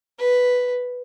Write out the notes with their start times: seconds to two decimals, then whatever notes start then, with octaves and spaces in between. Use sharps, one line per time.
0.19 B4